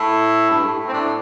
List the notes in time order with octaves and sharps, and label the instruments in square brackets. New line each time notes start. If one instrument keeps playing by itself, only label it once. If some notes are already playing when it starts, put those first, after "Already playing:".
Already playing: [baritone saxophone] A2 [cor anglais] E4
[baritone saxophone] G2
A2
A2
[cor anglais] C4
[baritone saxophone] A2 [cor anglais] D4